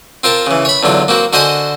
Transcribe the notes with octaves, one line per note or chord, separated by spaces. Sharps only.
C4 F4 A#4 A5
C#3 E3
C#5 B5
E2 D3 F#3 F4
A#3 C4 F#4
D3 F#4 C5 D#5 G#5 C6